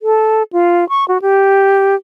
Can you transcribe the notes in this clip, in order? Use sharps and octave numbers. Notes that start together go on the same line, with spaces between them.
A4
F4
C#6
F#4
G4